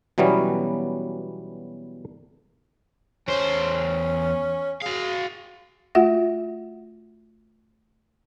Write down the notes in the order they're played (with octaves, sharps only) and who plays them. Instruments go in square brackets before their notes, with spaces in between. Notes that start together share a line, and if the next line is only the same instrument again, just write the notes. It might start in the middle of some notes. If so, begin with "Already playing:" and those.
[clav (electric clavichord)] B2 E3 F#3 G3 B3 C#4
[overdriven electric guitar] E2 C5 [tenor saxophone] C#4
[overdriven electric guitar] F#4 F5 [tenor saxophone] G#4
[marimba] A3 F4 F#4 E5 F#5 A#6